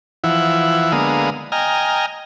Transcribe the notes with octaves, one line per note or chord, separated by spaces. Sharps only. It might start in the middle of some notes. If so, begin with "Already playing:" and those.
E3 F3 E4 F#5
D3 G#3 A#3 B3 F5 D#6
D#5 G5 G#5 A#5 F6